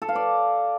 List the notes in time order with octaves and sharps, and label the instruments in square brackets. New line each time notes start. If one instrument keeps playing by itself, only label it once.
[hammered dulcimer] A4
F5
D5